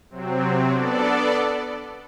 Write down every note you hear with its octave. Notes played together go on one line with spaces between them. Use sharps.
C3 F#3 C4
B3 D4 A4 D5